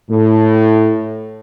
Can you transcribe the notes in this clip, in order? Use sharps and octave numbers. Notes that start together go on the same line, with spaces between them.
A2